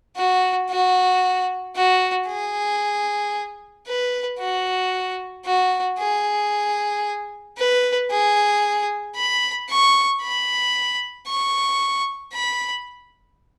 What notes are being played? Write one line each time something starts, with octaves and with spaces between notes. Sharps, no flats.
F#4
F#4
F#4
G#4
B4
F#4
F#4
G#4
B4
G#4
B5
C#6
B5
C#6
B5